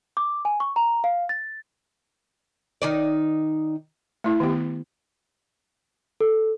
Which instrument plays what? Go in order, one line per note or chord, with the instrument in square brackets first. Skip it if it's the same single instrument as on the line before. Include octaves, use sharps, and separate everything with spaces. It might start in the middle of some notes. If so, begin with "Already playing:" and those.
[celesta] D6
G#5
C#6
A#5
F5
A6
[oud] D#3 D#4 D5
[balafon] A3 E4
D#3 B3 G4
[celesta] A4